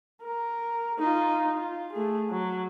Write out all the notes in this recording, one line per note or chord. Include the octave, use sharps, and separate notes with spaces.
A#4
D#4 F4
F4
A3 G#4
F#3